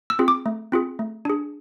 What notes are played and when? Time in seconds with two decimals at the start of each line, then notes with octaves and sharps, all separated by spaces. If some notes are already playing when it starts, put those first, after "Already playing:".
0.10 E6
0.19 C4 F4 G#4
0.28 D6
0.46 A3
0.72 C4 F4 G#4
0.99 A3
1.25 D4 G#4